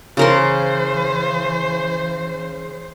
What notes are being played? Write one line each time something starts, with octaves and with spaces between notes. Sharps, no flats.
C#3 E3 A#4 C5 C6